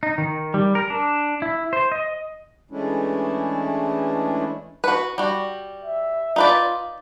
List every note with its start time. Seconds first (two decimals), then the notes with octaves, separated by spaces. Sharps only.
0.03 D#4
0.18 D#3
0.54 G3
0.75 A#4
0.90 D4
1.42 E4
1.73 C5
1.92 D#5
2.71 E3 G#3 A3 C#4 D4 E4
4.84 F#4 B4
5.18 G3 F#4
5.85 E5
6.36 D#4 F4 B4 D5